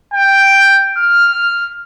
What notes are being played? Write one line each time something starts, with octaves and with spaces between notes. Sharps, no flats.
G5
F6